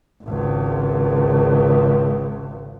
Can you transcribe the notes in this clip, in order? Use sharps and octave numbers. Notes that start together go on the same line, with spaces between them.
G#1 C#2